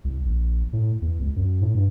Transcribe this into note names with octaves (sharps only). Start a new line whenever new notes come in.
C2
A#1
A2
E2
C#2
F#2
A2
G2